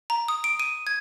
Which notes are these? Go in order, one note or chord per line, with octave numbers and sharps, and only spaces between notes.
A#5
D#6
D7
D#7
G#6